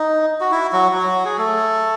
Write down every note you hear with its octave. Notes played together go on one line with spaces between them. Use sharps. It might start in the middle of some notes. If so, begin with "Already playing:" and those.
Already playing: D#4
F#4
E4
F#3 F#4
F#3 F#4
G#4
A3 A4